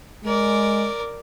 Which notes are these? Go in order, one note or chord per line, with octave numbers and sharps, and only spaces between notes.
G#3 A#4 D5